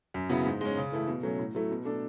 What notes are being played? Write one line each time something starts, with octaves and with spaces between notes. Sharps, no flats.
F#2
C#3 F#3 B3 E4
G#2
G#3 C#4
C#3
E3 A3 E4 A4
B2
F#3 A3 C#4
A2
F#3 A3 E4
B2
A3 D4 A4